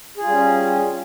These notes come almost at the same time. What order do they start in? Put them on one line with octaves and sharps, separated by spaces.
G#4 F4 G3 C#4